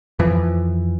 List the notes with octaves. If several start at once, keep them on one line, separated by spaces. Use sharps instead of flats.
F2 E3 F3